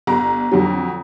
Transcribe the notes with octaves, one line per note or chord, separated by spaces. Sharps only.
G1 A#5
F2 D3 F#3